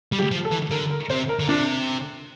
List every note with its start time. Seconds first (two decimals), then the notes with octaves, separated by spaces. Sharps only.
0.12 G3
0.19 G4
0.31 F3
0.45 A4
0.51 E3
0.71 D3 A#4
0.90 A#4
1.09 C3 C5
1.29 A#4
1.40 D3
1.49 C3 D4